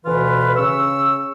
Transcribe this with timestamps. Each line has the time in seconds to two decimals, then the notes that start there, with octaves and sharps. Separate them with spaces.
0.05 D2 B2 E3 F4 B4
0.57 C#3 C#6 E6